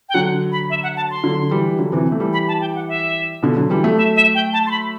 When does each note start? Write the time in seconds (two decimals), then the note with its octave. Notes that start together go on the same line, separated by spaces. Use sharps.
0.09 G5
0.14 D3 F#3 F#5
0.52 B5
0.70 E5
0.83 F#5
0.96 A5
1.11 C6
1.24 D3 F#3
1.51 E3 G3
1.79 D3 F#3
1.92 C3 E3
2.12 A3
2.20 E3 G3
2.33 B5
2.48 A5
2.61 G5
2.75 F#5
2.88 E5
3.43 B2 D3
3.57 D3 F#3
3.70 E3 G3
3.84 F#3 A3
3.97 E5
4.16 E5
4.35 G5
4.53 A5
4.67 C6
4.71 B5